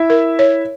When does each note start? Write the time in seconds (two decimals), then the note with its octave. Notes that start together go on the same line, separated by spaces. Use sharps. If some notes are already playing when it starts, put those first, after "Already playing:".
Already playing: E4 E5
0.10 A#4
0.39 C#5